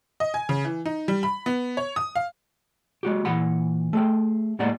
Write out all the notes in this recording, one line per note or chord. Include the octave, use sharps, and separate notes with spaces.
D#5
G#5
C#3
E3
D#4
G3
B5
B3
C#5
D#6
F5
G#3 F#4 G4
A#2 E3 F#5 B5
A3 G#4 G5
A2 G3 G#3 A#3 D5 F#5